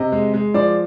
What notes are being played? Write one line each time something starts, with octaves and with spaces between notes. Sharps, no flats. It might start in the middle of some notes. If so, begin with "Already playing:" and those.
Already playing: C3 D#5
G#3
G#3
F3 D5